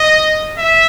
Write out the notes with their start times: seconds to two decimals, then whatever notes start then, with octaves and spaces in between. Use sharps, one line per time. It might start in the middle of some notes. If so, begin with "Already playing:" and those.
Already playing: D#5
0.58 E5